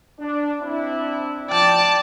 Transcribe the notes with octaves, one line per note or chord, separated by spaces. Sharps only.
D4
C4 D4 E4
F3 D5 G5 A5